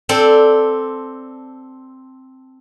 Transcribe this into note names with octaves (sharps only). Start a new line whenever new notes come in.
C4 A4 D5